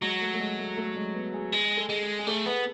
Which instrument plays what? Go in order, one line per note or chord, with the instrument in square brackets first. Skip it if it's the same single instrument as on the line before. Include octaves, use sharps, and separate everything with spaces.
[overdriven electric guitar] F#3 [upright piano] G#3
[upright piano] A3
A3
G#3
A3
A3
G#3
B3
G#4
[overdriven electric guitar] G#3 [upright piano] G#4
[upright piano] A4
[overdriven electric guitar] G#3
[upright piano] G#4
G#4
[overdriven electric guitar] A3 [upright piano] A4
[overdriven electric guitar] B3 [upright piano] B4